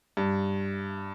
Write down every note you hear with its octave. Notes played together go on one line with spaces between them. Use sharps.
G2